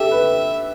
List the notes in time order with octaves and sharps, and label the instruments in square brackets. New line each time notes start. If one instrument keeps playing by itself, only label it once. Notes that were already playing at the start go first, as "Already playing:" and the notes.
Already playing: [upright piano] G4 A4 [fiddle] E5
[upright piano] B4